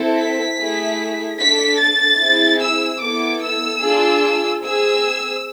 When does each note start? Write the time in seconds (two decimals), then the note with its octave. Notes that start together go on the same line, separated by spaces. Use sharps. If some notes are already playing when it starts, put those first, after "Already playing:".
Already playing: C4 E4 A4
0.17 B6
0.59 A3 E4 G#4
1.40 D4 A4 B6
1.80 A6
2.20 C4 E4 G#4
2.61 E6
3.01 B3 E4 A4 D6
3.42 E6
3.83 D4 F4 G#4
4.64 C4 G#4 E6